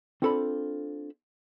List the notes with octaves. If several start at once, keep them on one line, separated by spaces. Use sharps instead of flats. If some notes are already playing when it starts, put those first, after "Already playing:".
C4 D4 F4 A4 C5 B5